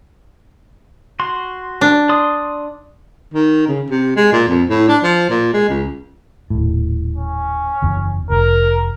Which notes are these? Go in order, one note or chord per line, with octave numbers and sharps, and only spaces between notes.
F#4 C6
D4
D5 C6 D#6
D#3
C#3
C3
G#3
A#2
F2
A2
D4
F3
A#2
G#3
C#2
D#1 A2
C#4
F#1 E2
F1 A#4